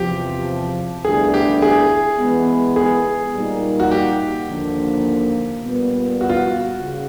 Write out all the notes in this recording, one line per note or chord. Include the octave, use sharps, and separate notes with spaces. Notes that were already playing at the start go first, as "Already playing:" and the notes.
Already playing: E2 C3 F3 G4
D2 D3 G3 B3 E4 G#4
G4
G#4
E3 G#3 B3
G#4
A#2 G3 A#3 D#4
F#4
G4
D#2 D3 F3 A#3
A#2 G3 B3
F#4
F4
F#4
C#3